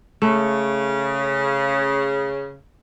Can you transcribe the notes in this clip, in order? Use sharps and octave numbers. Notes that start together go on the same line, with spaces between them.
C#3 A3